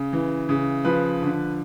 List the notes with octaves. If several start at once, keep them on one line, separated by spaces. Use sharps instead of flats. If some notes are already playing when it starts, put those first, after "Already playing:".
Already playing: C#3
E3
C#3
F3 B4
D3